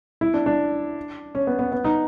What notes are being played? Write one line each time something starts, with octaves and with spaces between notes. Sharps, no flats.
E4
D4
D4
C#4
B3
B3
B3
D#4